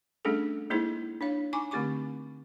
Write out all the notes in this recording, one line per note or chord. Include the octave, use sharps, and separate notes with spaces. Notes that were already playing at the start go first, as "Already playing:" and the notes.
G3 A3 C#4 D4 G#4 A4
G#3 A#3 D#4 E4 G#4 C5
D4 C#5 F5
D#4 G#5 C#6 D6
D3 A3 C4 G4 C#6 D6